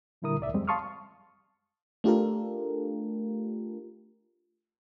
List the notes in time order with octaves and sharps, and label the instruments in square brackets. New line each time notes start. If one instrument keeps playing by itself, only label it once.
[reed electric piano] A#2 D3 G3 E4 A#4 D#6
C2 A2 D5 E5
F2 G3 G#3 C4
F5 A5 C6 C#6 D#6 F6
[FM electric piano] A3 D4 F4 G4 A4 A#4